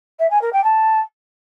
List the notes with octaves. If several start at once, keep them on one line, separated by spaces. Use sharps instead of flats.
E5
G#5
A#4
G5
A5